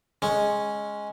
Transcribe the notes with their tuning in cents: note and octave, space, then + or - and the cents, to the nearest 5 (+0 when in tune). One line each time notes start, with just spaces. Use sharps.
G#3 +0 C#4 -5